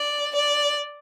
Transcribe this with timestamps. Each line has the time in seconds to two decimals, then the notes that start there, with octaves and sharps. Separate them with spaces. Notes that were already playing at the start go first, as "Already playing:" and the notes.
Already playing: D5
0.35 D5